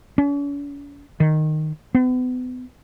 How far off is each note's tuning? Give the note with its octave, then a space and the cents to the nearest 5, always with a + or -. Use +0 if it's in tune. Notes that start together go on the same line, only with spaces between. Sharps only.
C#4 +45
D#3 -10
B3 +35